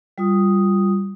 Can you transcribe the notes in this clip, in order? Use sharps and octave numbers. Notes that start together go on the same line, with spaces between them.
G3 F4 D#6